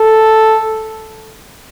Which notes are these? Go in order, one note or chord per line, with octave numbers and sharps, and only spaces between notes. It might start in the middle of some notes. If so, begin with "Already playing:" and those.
Already playing: A4